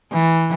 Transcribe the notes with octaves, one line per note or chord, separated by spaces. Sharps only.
E3